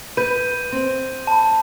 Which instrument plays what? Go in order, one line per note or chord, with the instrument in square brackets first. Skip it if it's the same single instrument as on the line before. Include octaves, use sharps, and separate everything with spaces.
[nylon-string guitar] B4 [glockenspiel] G6 D#7
[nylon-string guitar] C4
[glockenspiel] A5 B5